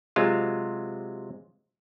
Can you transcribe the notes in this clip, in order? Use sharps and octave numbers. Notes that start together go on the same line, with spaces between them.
C3 F#3 G#3 F4